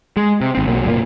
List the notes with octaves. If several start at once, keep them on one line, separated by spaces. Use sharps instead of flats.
G#3
C3
G#1 C4
B1 F#3 A#3
F#1 A#2 C#3 A#3